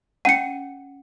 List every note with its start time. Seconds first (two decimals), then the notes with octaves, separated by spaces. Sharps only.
0.25 C#4 F#5 C#7 D#7